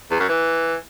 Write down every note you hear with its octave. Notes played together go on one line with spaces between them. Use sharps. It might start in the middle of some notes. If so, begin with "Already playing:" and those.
E2
F#2
E3